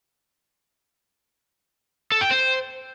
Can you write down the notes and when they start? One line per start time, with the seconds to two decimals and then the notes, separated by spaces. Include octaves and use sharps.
2.12 A4
2.21 G5
2.31 C5